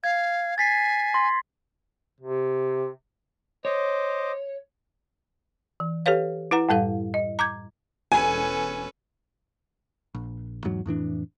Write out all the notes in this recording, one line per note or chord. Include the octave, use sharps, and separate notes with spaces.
F5 G#6
G#5 A6 B6 C7
C6 A#6
C3
C5 C#5 D#5 D6
E3
G4 A4 B4 C#5 F5
E4 B4 F#5 A#5
F#2 A2 G3 A4 F5
D#5
A#5 D6 G6 G#6
E1 C#4 A4 B4 G#5
A#1
E2 G#2 F#3
F2 A2 E3 D4